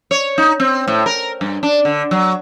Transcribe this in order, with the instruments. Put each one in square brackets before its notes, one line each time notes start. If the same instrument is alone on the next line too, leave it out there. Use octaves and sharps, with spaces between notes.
[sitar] C#5
D#4
C4
A2
A#4
G2
D4
D3
F#3